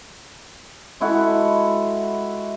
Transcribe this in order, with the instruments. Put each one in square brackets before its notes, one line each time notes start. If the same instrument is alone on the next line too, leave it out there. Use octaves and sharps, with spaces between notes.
[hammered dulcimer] G#3 E4 F#4 A4